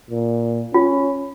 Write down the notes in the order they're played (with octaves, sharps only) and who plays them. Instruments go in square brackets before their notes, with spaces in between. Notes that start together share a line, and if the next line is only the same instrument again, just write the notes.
[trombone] A#2
[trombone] C#4 [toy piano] F4